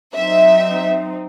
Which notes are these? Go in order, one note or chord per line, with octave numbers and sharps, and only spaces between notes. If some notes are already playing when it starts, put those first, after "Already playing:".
F#3 C4 D#4 E5